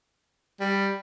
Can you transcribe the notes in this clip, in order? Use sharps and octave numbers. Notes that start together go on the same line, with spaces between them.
G3